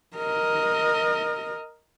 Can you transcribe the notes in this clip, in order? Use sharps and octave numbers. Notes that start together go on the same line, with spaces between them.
A#4 D#5